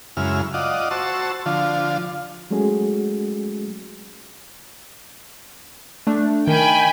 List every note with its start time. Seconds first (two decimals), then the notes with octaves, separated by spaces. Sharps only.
0.17 F#2 C#3 G#3 E4 F6
0.54 F4 D5 D#5 F#5
0.91 F#4 C5 A5 C#6 E6
1.46 D3 F3 F4
2.51 F#3 G#3 A3 C#4 F#4 G#4
6.07 A3 D4
6.47 D#3 G5 G#5 B5